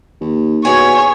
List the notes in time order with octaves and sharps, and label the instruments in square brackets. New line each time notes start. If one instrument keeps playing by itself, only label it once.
[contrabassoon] D#2
[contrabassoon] B2 [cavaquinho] E4 G#4 G#5 [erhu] C#5